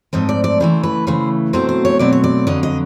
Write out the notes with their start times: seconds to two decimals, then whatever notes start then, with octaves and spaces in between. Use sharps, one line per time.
0.13 G#2 F3 A3 C4 D#5
0.29 D5
0.44 D5
0.60 C#3 E3 A3 C5
0.83 B4
1.07 C#3 E3 A3 C5
1.53 B2 F#3 A3 C4 C5
1.69 C5
1.85 C#5
1.99 B2 F#3 A3 C4 D5
2.13 C#5
2.24 D5
2.47 F2 D3 F#3 D#5
2.63 D#5